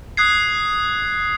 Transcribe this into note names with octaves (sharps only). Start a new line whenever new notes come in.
D#6 F#6 G#6 C7